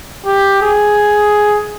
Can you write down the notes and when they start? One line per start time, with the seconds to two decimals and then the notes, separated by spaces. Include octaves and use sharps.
0.26 G4
0.62 G#4